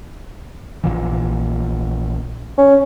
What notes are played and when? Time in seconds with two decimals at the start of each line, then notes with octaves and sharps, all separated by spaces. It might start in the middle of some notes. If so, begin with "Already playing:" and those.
0.84 A#1 A#2 E3
2.58 C#4